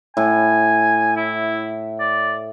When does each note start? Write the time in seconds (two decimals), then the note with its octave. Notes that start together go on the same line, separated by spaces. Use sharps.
0.17 A2 G#5
1.17 E4
2.00 D5